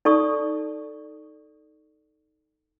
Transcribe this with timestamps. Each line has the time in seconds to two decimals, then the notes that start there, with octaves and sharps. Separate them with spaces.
0.05 D#4 A4 D5 A5 C#6 D#6